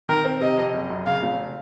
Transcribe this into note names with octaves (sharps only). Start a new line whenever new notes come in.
D#3 A#4
C4
C3 D#5
F2
F#1
F#2
C#3 F5
F1